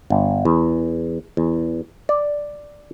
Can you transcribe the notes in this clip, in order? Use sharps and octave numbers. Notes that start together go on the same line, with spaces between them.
G1
E2
E2
D5